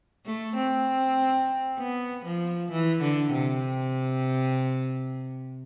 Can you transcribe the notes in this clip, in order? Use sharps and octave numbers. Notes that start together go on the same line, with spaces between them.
A3
C4
B3
F3
E3
D3
C3